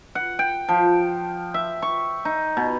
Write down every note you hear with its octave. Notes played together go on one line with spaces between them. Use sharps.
F#5
G5
F3
E5
C#6
D#4
B2